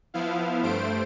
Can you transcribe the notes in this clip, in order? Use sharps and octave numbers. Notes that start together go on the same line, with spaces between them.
F3 B3 E4 F5
G2 A3 C5 D7